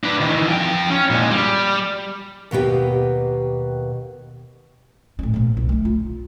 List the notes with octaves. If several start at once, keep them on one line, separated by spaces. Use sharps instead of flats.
D4 B4
D#3 E3
F3 G5
C#4
A#2 G#3
G3
D#2 B2 B3 G4
A2 C#4
A#1 B2
C2
A3 D4
F4